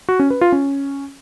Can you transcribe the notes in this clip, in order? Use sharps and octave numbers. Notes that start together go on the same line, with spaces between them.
F#4
C#4
B4
F4
C#4